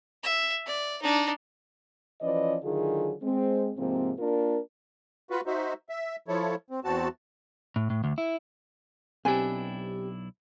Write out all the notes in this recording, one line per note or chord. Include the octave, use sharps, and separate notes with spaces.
E5
D5
D4 D#4
E3 F3 C#4 B4 D5 D#5
D3 D#3 F#3 F4 G#4
G#3 C4
G#2 C3 F3 A#3 C4
A#3 D4 F4 A#4
F4 F#4 B4
D#4 F#4 C5 E5
E5
F3 E4 A4 C#5
C4
E2 C4 F#4 A5
A2
A2
D2
E4
B1 C4 D4 E4 G4 B4 G#5